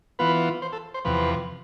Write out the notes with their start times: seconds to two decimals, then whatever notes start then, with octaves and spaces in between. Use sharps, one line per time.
0.19 E3 B3 F4 B4
0.62 C5
0.73 A4
0.94 C5
1.05 E2 C3 F3 B4